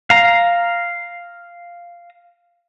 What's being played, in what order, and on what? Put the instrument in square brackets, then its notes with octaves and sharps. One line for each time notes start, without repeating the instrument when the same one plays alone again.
[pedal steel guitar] F5 A#5